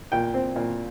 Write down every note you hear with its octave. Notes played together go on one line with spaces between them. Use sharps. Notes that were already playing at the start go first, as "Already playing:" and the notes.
A#2 G5
C4
A#2